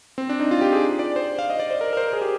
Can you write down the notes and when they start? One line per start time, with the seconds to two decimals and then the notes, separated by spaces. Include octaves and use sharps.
0.18 C4
0.29 D4
0.40 D#4
0.51 F4
0.61 G4
0.73 G#4
0.99 D5
1.16 C5
1.39 F5
1.50 D#5
1.60 D5
1.71 C5
1.81 A#4
1.93 A#4
1.97 C5
2.13 G#4
2.21 G4